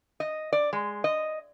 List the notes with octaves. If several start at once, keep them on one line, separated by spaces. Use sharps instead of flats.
D#5
D5
G#3
D#5